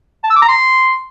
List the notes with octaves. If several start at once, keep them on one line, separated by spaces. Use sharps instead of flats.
A5
E6
D6
A#5
C6